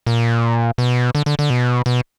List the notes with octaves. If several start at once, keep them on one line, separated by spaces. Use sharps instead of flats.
A#2
B2
D3
D3
D3
B2
B2